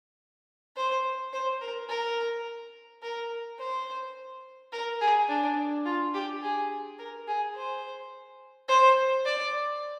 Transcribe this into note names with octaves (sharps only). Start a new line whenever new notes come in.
C5
C5
A#4
A#4
A#4
C5
A#4
G#4
D4
F4
G4
G#4
A#4
G#4
C5
C5
D5